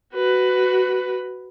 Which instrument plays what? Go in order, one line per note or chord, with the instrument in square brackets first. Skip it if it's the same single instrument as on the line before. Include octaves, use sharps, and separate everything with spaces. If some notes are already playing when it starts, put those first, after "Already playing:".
[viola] F#4 B4